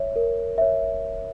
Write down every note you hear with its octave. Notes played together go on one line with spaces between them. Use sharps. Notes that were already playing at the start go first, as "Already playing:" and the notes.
Already playing: C#5 E5
A#4
C#5 E5